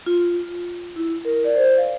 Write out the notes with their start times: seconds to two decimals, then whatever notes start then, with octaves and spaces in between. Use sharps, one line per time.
0.06 F4
0.96 E4
1.25 A#4
1.44 D5
1.55 C5
1.78 F5